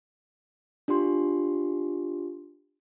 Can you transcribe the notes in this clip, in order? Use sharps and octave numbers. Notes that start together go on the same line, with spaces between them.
D4 F4 G4 C6